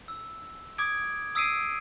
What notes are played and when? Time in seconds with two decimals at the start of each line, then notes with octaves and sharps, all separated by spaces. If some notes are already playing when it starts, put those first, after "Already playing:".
0.08 E6
0.78 D6 D#6 G#6 D7
1.35 D#6 E6 B6 C7 D7 D#7